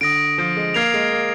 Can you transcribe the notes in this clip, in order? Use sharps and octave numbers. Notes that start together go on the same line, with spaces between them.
D3 D#6 A#6 D7
F3
G#3
A#3 F6 G#6 C7 F7
G#3
A#3